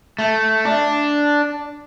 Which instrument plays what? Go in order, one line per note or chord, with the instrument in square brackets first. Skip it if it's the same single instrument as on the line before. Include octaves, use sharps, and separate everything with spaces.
[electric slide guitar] A3
D4